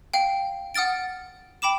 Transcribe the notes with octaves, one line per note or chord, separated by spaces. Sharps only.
F5 G5
F#5 D#6 F6 A6 D7
G5 B5 D6 E7